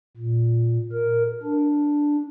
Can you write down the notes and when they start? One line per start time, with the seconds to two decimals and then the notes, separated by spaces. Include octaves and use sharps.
0.17 A#2
0.93 A#4
1.43 D4